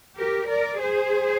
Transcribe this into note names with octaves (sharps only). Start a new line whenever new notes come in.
G4 A#4
A#4 D5
G#4 C5